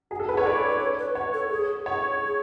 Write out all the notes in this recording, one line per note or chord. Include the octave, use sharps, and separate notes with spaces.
F#4 G#4
A4
G#4 B4
C#5
G#4 D5
A4
B4
C#5
B4
B4 C#5
A4
G#4
C#5
G#4